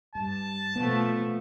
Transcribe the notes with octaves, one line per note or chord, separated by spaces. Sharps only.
G2 A5
B2 F3 A3 B3